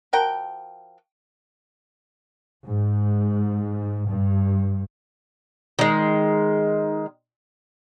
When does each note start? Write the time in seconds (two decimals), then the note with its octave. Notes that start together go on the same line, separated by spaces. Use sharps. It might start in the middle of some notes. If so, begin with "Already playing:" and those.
0.13 F3 F#4 A#4 G5
2.67 G#2
4.07 G2
5.79 D#3 G#3